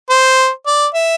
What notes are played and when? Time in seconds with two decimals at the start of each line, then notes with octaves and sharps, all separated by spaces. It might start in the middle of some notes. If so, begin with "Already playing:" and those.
0.10 C5
0.67 D5
0.94 E5